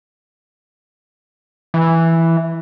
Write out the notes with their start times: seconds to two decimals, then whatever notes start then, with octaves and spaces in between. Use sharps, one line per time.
1.74 E3